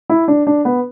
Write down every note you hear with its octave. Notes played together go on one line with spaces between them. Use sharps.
E4
D4
D4
B3